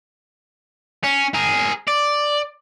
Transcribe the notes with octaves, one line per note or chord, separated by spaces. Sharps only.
C#4
G#4 A#4
D5